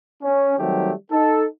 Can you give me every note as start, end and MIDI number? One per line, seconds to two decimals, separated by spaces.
0.22 0.57 61
0.59 0.92 51
0.59 0.92 54
0.59 0.92 55
0.59 0.92 57
0.59 0.92 60
0.59 0.92 67
1.12 1.46 63
1.12 1.46 69